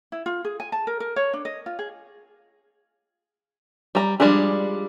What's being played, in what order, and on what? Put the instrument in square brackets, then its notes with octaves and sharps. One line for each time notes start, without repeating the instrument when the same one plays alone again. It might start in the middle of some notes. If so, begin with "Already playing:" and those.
[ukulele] E4
F4
G#4
G#5
A5
A#4
A#4
C#5
D4
D#5
F4
G#4
[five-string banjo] G3 A#5
F3 G3 G#3 D4 G#4